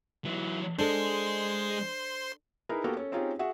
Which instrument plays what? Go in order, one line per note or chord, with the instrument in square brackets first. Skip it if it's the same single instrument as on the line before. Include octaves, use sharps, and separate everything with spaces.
[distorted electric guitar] E3 F#3
[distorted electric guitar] G#3 [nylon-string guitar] D4 A4 [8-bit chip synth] C5 C6
[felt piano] D#4 E4 G#4 A#4 B4
A#3 B3 F#4 G4 A4 A#4
C#4 A4
C4 C#4 D#4 F4 G4 G#4
F#4 G#4 E5 F#5